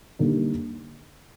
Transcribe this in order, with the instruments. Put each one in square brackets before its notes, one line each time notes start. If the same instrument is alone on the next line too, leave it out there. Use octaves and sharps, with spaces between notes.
[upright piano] D3 G3 A#3 D#4